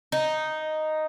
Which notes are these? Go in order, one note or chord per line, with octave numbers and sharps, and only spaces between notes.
D#4